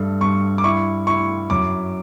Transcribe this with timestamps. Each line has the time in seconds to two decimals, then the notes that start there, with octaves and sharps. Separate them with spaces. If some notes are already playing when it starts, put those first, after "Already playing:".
Already playing: G2 A3
0.21 G2 C#6
0.58 D6
0.64 E4 C#6
1.07 E4 C#6
1.50 F#2 D6